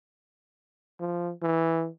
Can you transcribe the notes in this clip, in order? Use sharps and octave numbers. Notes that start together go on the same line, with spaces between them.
F3
E3